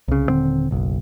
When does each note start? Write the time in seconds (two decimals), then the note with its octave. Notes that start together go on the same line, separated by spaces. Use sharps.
0.08 C2 C#3
0.28 D#1 D3 C4
0.71 F#1 B1